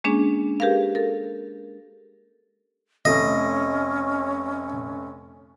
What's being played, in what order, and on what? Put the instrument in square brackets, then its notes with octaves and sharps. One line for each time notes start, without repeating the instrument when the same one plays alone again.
[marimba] G#3 A#3 C#4 D4 G#4
G4 G#4 A#4 B4 F5
A4 A#4
[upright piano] F1 A3 [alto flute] C#4 [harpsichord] D#5